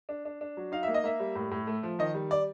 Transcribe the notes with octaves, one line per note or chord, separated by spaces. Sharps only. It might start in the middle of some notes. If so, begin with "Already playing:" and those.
D4
D4
D4
F#3
D#4 F5
A#3 E5
D#5
A#3 E5
G3
A2
A2
A3
F3
D#3 D#5
G3
D5